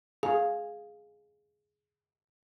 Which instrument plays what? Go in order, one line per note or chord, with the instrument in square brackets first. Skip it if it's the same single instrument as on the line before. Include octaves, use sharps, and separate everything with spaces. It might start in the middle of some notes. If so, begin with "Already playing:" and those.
[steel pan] G#4 [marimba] F5